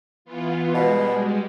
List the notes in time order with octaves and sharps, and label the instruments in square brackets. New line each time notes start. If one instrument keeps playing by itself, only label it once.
[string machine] E3 B3 F4
[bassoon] B2 [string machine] G3 G#3